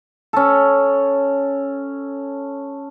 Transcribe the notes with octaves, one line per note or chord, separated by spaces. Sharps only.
C#4 A4